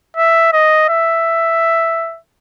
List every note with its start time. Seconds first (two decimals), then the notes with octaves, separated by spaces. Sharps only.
0.17 E5
0.53 D#5
0.89 E5